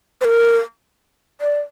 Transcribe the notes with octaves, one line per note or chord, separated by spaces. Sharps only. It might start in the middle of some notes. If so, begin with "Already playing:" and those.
C5
A#4
D5